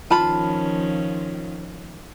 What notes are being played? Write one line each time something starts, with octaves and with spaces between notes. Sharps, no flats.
D#3 F3 C#4 F4 A5 B5